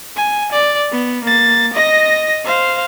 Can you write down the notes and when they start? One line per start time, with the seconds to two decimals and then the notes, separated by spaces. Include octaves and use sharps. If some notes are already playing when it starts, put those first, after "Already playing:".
0.16 G#5
0.52 D5
0.92 B3
1.24 A#3 A6
1.74 D#5 A#6
2.45 C5 F5